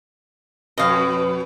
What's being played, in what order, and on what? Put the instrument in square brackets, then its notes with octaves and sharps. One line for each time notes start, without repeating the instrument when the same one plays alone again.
[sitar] F2 B2 [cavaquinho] D#5 F5